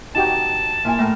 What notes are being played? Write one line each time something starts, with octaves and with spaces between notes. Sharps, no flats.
D#4 F#4 G4 A5
A#2 E4 G#5
A2 A#4 F6